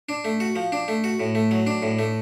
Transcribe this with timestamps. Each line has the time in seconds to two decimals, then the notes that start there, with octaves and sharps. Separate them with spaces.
0.09 D4
0.25 A3
0.40 F#4
0.56 F3
0.72 D4
0.88 A3
1.04 F#4
1.20 A2
1.35 A3
1.51 F#3
1.67 D4
1.83 A2
1.99 A3